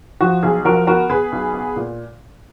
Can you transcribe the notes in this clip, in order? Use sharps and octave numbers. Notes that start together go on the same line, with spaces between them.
F3 F#4
B1 G#4
F3 F#4 A#4
B3 F#4 A#4
B3 G#4 B4
B1
B3
A#2